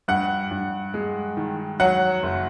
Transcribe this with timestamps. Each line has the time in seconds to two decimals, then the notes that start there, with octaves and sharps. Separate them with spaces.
0.08 G2 F#5
0.51 G2
0.94 G#3
1.37 D#3
1.80 F#3 F#5
2.23 F#1